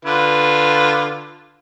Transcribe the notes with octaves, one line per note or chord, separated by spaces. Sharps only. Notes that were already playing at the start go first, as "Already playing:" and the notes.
D3 F4 B4